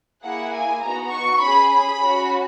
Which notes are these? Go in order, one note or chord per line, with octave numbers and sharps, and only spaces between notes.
A#3 E4 G#4 F#5
G#5
B3 D#4 F#4 A#5
C#6
C#4 G#4 B5
B5
C#4 F#4